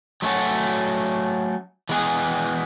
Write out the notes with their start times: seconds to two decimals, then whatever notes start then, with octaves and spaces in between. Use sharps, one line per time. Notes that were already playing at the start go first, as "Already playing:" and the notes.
0.22 F#3 A3 C#4 F#4
1.89 E3 G#3 B3 E4 G#4